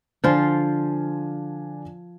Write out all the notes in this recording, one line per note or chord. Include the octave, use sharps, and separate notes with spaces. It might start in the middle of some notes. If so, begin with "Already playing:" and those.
D3 F3 D4 F4 C5 G#5